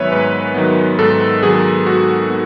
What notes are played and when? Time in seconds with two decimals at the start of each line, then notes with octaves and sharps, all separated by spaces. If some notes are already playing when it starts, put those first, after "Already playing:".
Already playing: G#2 D#3 F#3 B3 B4 C#5 E5 G#5
0.12 G#2 B4
0.55 D#3 F#3 B3
0.99 G#2 A4
1.42 D#3 F#3 B3 G#4
1.86 G#2 F#4
2.30 B3